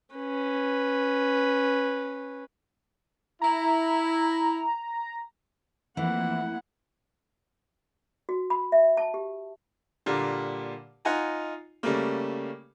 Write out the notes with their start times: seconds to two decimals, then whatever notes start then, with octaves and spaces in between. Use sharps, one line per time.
0.15 C#4 B4
3.41 E4 A#5
5.97 F2 E3 F3 A3 A#3 E4 F#5
8.29 F#4
8.50 B5
8.72 E5
8.97 A5
9.14 G4
10.06 A#2 D3 G3 A#3
11.05 D#4 F4 F#5 G#5 A#5
11.83 C#3 G3 A3 A#3